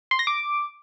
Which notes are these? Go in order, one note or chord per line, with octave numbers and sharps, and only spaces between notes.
C6
A#6
D6